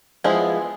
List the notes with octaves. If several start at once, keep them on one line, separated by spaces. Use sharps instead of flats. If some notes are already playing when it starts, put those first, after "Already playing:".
F3 G#3 B3 E4 G#4